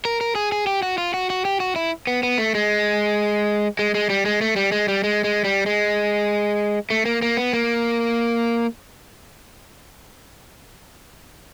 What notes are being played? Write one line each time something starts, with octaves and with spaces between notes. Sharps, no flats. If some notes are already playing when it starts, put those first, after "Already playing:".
A#4
A#4
G#4
G#4
G4
F#4
F4
F#4
F#4
G4
F#4
E4
B3
B3
A3
G#3
G#3
G#3
G3
G#3
A3
G3
G#3
G3
G#3
G#3
G3
G#3
A3
A#3
A#3
B3
A#3